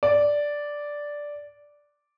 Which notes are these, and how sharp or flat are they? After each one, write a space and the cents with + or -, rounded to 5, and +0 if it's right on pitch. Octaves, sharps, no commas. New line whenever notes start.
D5 -5